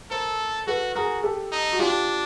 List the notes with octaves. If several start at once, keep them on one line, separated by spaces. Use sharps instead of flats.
A4 A#4 C5
F#4 A4 B4
F#4 G#4 A#4
G4 A4
D#4
F#4
D4 F4 G4